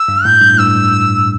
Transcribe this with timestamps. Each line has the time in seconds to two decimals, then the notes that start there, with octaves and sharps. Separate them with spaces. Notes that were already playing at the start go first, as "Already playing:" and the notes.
Already playing: E6
0.08 G2
0.25 A2 G6
0.41 G2
0.54 A2
0.58 G2 E6